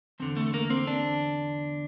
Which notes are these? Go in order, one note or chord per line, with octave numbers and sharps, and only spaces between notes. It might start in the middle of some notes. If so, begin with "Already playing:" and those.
E2 D3 F3 C4
A3
A#3
C4
D4